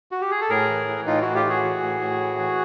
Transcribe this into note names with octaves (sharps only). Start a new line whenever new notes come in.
F#4
G4
G#4
A4
A2 G#4 A#4
E3
E3
A2 D#4 F4
A2 E4 F#4
F4 G4
E3 F#4 G#4
E3
A2
A2
E3
E3